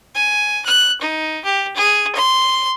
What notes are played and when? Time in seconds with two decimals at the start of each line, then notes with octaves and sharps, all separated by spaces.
0.15 G#5
0.65 F#6
1.01 D#4
1.45 G4
1.76 G#4
2.15 C6